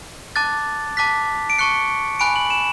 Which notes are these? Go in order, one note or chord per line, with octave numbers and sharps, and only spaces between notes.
A5 D6 F#6 A6
A5 D6 F#6 B6
D7
A5 C#6 F#6 C#7
G#5 B5 F#6 D7
F#7
E7